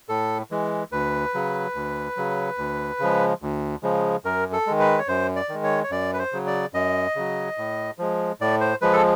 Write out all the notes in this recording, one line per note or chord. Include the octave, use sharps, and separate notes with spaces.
A2 A4
E3 G#3
D2 B4
C#3 F#3
D2
C#3 F#3
D2
C#3 F3 G#3
D2
C#3 F3 G#3
F#2 A#4
A4
D#3 G#3
B4
C#5
F#2 C5
D5
D#3 G#3
C#5
C#5
F#2 D5
B4
C5
C#3 F#3
D5
F#2 D#5
C#3 F#3
A2
F3 G#3
A2 D5
C5
F3 G#3 B4
A4